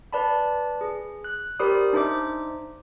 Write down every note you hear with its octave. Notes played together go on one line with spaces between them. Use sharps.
B4 D5 A5 B5
G#4
F#6
G4 A#4 C5 D5 B5 D#6
D4 D#4 C5 E5 D6